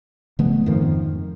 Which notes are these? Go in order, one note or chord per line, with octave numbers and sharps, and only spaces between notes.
C#3 F3 A3 B3
F2 G#2 D#3 F3